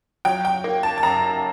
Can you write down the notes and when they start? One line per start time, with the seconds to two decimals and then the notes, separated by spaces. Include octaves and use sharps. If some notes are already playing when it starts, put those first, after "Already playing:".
0.25 F#3 G5
0.45 G5
0.64 A#3
0.83 A5
0.98 A5
1.03 F#2 A#5